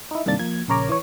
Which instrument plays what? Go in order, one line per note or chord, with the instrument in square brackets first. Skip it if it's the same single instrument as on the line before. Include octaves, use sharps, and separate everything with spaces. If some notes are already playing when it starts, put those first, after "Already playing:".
[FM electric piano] D#4 E4
G2 C3 D#3 A#3 D4 A6
F3 A#3 G#6
A#1 C#3 A#4 C#5 A#5 D6
E3 C#5